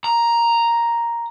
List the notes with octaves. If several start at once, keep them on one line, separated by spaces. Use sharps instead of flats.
A#5